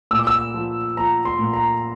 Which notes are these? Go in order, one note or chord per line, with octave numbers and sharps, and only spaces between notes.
A#2 E6
D6
E6
F3
F3 A#5
C6
A#2
A#5